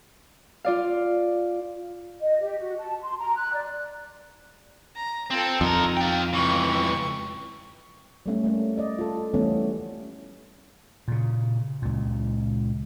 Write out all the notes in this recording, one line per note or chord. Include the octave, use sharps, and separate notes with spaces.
F4 D5 F5
D#5
G4
F#4
A5
C6
A#5
F#6
D5
A#5
C4 F4 A4
F2 F3 D#4 A#4
F4 G5
C#2 E3 G5 C#6
G3 A3 C#4
A3 A#3 C#4
D5 D#5
F4 A4
E3 F3 G3 A3 B3 C#4
A#2 C#3
C#2 A#2